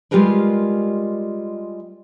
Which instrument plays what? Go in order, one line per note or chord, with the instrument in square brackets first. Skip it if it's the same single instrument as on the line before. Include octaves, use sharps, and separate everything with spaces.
[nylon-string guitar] G3 G#3 F4 G4 A#4 B4